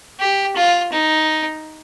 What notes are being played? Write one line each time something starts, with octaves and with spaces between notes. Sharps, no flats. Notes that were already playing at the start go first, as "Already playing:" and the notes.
G4
F4
D#4